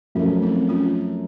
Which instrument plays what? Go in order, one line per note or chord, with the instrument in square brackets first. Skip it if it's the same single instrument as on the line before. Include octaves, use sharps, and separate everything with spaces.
[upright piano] F#2 F3 A3 [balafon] C#4 F4
[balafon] C4 D#4
C#4 F4